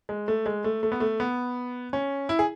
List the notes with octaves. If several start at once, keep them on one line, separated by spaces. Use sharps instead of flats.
G#3
A3
G#3
A3
A3
B3
A3
B3
C#4
E4
G#4